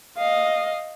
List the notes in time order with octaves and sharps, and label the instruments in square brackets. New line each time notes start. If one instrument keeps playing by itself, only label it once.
[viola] D#5 F5